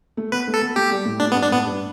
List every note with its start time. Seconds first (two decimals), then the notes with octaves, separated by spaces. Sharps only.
0.17 A3
0.32 B3 B4
0.48 A3
0.54 A4
0.62 B3
0.76 A3 G4
0.91 G3
1.05 A2
1.20 A2 D4
1.32 B3
1.35 G2
1.42 D4
1.50 A2 B3
1.64 G2